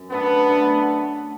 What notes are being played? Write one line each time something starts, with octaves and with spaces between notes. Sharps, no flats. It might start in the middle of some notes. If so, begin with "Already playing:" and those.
Already playing: F#2
D3 A3 B3 D4 A4
D3 A3 D4 A4